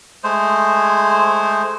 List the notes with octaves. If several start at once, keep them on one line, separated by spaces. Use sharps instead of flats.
G#3 A3 C5